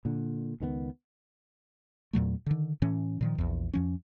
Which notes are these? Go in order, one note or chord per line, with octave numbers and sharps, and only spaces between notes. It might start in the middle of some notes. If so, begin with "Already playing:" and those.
A#2 D3
C#2 D#3 F#3 B3
E2 A#2 F#3 A3
D3 D#3
A2 E3 C#4
A#2 D#3 F3
A#1 E2
F2 F3 C#4